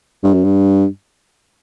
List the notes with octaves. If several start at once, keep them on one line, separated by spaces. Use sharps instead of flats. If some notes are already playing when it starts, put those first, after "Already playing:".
G2
F#2
G2